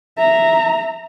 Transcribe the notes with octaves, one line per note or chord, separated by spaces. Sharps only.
E5 A#5